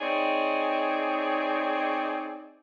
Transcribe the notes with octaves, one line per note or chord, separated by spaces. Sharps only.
C4 D#4 G#4 C#5 D5